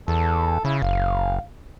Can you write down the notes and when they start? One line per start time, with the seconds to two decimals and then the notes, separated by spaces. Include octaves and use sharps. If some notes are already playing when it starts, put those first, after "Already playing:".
0.08 E2 A4
0.65 C#3 E4
0.82 F#1 F5